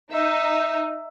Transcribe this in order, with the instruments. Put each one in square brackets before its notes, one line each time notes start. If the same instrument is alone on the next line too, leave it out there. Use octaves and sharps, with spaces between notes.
[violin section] D#4 [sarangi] E5